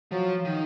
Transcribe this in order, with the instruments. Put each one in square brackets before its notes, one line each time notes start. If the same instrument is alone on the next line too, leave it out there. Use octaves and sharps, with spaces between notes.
[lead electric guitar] F3 [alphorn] F#3
[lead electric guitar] D#3